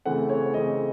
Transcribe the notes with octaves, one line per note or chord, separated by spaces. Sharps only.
C#3 E3 A3 C4 F#5
C#5
C#3 E3 A3 C4 D#5